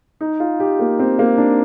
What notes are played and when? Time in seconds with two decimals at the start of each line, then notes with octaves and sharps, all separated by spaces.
0.21 D#4
0.40 F4
0.60 G4
0.79 A#3
0.99 C4
1.19 A#3
1.38 D4